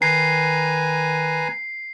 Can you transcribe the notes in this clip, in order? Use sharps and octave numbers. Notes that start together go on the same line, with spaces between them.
D#3 B4 G#5 A#5 C7